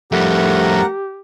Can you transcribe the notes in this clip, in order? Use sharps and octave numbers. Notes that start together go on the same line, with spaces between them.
F2 G3 A3 G4 A#4 F#5 A#5